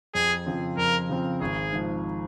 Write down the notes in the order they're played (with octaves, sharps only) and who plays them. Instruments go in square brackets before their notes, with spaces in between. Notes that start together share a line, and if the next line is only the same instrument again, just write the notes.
[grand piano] F2 [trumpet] G#4
[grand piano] C#3 F3 C4
[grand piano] F2 [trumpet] A#4
[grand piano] C#3 F3 C4
[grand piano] G#1 [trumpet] G#4
[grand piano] G#2 F3